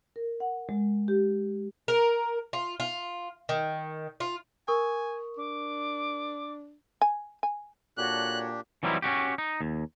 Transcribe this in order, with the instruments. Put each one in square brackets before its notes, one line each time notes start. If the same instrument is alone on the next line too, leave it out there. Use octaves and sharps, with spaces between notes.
[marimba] A#4
F#5
G#3
G4
[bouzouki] A#4
F4
F4
D#3
F4
[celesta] A#4 C#6 D#6 [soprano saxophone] G#5
[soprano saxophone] D4 [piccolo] D6
[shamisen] G#5
G#5
[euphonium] A#2 [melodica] D4 G4 [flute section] F#4 A4 C#5 [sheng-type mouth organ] F#6
[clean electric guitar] E3 F#3 G3 C4 D#4 E4
C#4 D4 F#4 G4
D#4
D#2